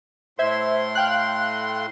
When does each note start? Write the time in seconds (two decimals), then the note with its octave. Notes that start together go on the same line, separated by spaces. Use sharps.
0.39 A2 C5 E5 C6 G#6
0.95 F5 G5 F#6